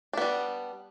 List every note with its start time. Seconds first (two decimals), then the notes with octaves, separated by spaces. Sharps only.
0.13 D4
0.17 B3
0.21 G3